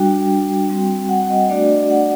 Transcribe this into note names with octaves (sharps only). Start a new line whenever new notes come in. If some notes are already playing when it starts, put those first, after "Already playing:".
Already playing: G3 D4 F#4 G5
G3 C4 F#4
F#5
D#5
A3 D4 F#4 D5
F#5